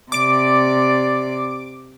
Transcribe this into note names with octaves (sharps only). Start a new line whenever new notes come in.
C3 D5 D6 D7